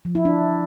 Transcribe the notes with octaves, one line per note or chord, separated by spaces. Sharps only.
F3
E4
D4